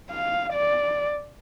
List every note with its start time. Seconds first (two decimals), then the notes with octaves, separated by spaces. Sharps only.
0.11 F5
0.53 D5